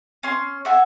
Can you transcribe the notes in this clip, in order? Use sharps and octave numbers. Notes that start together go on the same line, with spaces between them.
C#4 C6
E5 F#5 G#5